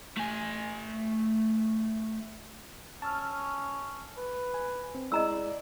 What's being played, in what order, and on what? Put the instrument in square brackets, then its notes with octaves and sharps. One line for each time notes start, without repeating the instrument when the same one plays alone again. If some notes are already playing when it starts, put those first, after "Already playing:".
[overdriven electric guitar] A3 G#5
[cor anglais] C#4 [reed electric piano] A5 E6 F6
[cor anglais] B4
[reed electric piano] G#5
C4
[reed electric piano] G#3 E4 G#4 [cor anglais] D5 [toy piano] D#5 A#5 E6